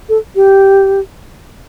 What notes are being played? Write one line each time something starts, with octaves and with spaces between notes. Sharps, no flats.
A4
G4